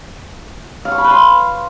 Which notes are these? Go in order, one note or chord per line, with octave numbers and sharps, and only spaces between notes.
F5
C#6
B5
B4
C6